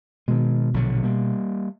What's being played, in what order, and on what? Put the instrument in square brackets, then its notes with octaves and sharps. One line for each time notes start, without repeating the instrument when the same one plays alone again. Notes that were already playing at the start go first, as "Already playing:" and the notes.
[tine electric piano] B2 [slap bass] D#3 G#3
[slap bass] A#1 D3 F#3
G3 A#3